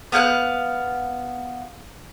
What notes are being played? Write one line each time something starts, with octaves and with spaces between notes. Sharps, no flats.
B3 F5 G5 F#6